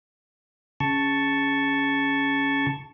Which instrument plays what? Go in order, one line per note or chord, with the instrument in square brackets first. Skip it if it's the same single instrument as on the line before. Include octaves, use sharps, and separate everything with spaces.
[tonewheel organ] C#3 A5 C#6